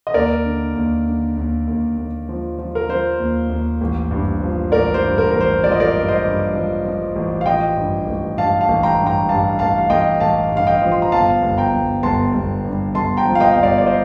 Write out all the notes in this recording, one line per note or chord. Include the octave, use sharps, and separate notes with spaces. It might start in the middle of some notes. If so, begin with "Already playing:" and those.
D#5
D#2 A#4 D5
D3
D#2
D3
D#2
D#2
D#2
F3
F3
A#4
F3 C5
D#2
D#2
A1
G2
F3
A1 A#4 D5
C5
G2
A#4
A1 A#4
C5
F3 D5
D#5
A#4 D5
G2
C5 D#5
G2
F3
F3
A1
F5
F3 D#5 G5
G2
A1
G2 F5 A5
F5 A5
A1
G5 A#5
G2
G5 A#5
G2 F5 A5
A1 F5 A5
F5
A1 D#5 G5
A1 F5 A5
G2
F5
D#5 G5
F3
C6
A#5
G1 F5 A5
G1
G5 A#5
G1
G1 A5 C6
G1
G2
G1 A5 C6
G5 A#5
F3
F5
D#5 G5
G1 G5
D5 F5
D5
C5 D#5